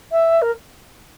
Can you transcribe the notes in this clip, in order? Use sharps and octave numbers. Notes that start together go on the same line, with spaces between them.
E5
A#4